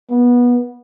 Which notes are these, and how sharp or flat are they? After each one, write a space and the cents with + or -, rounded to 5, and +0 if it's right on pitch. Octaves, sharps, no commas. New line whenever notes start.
B3 -20